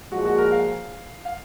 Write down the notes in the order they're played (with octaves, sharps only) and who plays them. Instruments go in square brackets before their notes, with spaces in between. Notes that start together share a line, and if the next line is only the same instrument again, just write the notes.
[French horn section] A#2 F3 G#3 [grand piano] F#4
[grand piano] F#4
A#4
F5
F5